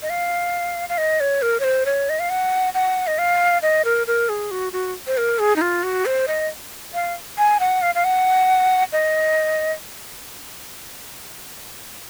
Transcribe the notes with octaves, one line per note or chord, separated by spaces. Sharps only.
D#5
F5
F5
D#5
C#5
A#4
C#5
C5
C#5
D#5
F5
F#5
F#5
D#5
F5
D#5
A#4
A#4
G#4
F#4
F#4
C5
A#4
G#4
D#4
F4
F#4
C5
D#5
F5
G#5
F#5
F5
F5
F#5
D#5